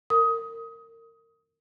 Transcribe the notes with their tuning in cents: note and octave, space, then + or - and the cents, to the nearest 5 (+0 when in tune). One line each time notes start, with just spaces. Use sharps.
A#4 -30 D#6 +20